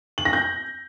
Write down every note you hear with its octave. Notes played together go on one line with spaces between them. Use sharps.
F#7
A#6
G6